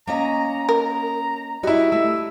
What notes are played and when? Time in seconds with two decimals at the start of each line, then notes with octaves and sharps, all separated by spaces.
0.07 A#3 C#4 D#5 A#5
0.69 A#4 A#5
1.63 G3 E4 F#4 D#5
1.92 A3 E6